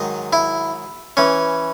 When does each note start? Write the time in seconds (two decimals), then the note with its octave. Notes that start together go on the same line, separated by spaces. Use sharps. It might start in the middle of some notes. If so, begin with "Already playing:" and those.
Already playing: G#2 D#3 F#3 D#5
0.33 E4
1.17 E3 C#4